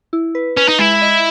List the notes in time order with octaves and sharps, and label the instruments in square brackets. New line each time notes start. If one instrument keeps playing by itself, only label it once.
[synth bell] E4
B4
[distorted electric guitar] C#4 [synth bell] B4
[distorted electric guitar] D#4
[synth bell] G#3 [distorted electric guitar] E4
[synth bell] D#5